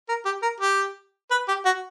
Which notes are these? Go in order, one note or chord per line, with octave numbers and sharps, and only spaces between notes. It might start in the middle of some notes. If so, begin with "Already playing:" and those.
A#4
G4
A#4
G4
B4
G4
F#4